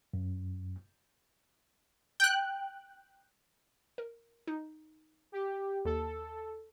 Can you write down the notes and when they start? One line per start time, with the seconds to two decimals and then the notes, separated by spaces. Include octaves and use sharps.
0.14 F#2
2.20 G5 F#6
3.98 A#4
4.47 D#4
5.32 G4
5.85 D#2 A4